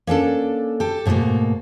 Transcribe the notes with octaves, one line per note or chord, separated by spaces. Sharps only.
A#3 C#4 D4 A4
G4 A4
G#2 B2 G3 A3 A#3